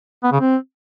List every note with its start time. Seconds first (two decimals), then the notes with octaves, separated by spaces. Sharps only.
0.23 B3
0.32 C#3
0.40 C4